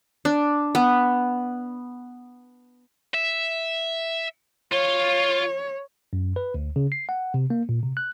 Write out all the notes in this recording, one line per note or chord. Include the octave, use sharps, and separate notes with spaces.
D4
B3
E5
F4 C#5
F#2
B4
D2
C#3
C7
F#5
C3
A#3
A#2
C3
F#6